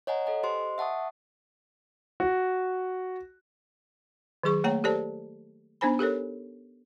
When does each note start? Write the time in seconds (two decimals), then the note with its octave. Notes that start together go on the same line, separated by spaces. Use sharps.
0.07 C#5 D#5 F#5 G#5 A#5
0.26 A4 D#5 G#5
0.43 G4 C5 D#5 C6
0.78 E5 F#5 A5 C#6 D#6
2.20 F#4
4.43 D#3 F#3 G#4 C#6
4.64 A3 A#3 C#5 G5 A#5
4.84 G4 A4 C5 D5 A5
5.81 B3 D4 D#4 C5 G#5 B5
5.99 G4 A4 A#4 C#5